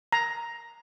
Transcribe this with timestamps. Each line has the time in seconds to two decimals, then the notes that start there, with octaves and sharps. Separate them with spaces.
0.12 A#5